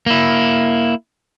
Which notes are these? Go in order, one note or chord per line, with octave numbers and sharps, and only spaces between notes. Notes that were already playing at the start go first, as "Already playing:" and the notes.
A#3 E4